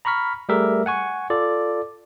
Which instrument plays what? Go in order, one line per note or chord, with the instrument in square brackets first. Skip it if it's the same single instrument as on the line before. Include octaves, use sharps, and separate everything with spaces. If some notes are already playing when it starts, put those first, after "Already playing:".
[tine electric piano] A#5 B5 C#6 F6 B6
G3 A3 G4 G#4 A#4 E5
F#5 G#5 C#6
F4 A4 D5